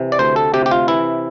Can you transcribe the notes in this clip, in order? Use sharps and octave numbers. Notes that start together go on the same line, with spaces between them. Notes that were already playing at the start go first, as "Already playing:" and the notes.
Already playing: C3 E3
D5
D2 C5
A4
C3 G4
G4
F4
E3 E4